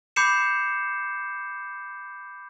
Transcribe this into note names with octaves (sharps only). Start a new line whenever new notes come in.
B5 D6 G6 C7 C#7 E7